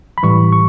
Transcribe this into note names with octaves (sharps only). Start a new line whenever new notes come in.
B5
A2 E3 G3 C#6
C#6